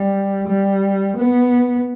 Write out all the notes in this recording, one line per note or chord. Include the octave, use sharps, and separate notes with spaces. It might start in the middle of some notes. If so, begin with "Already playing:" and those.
Already playing: G3
G3
B3